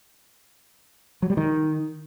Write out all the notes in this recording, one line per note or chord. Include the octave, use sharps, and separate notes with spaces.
F#3
G3
D#3